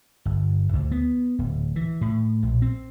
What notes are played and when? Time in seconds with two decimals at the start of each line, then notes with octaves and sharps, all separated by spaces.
0.25 G1
0.73 D2
0.92 B3
1.39 D1
1.76 E3
2.01 A2
2.43 A#1
2.62 C4